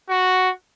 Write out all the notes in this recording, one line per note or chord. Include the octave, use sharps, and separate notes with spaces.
F#4